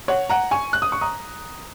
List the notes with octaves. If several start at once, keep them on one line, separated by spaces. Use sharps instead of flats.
C#5 F#5
F#5 A#5
G#5 C#6
F#6
D#6
C#6
A#5 D#6